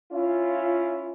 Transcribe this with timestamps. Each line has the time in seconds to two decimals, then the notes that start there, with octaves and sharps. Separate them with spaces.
0.11 C#4 E4 F4